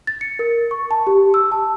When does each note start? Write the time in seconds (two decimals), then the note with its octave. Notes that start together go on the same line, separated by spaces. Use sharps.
0.07 A6
0.21 C#7
0.39 A#4
0.71 C#6
0.91 A5
1.07 G4
1.34 E6
1.52 A5